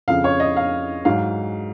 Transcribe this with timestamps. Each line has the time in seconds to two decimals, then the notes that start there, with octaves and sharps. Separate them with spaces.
0.08 F2 C#3 F3 F5
0.24 C#5
0.40 D#5
0.57 F5
1.05 G#2 F#3 F5